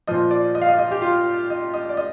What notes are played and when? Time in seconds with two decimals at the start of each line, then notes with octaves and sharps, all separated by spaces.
0.07 A#2 F3 D#5
0.31 D5
0.55 D#5
0.62 F5
0.69 D#5
0.79 D#5
0.91 G4
1.02 F4
1.50 D#5
1.74 D#5
1.89 D5
1.97 D#5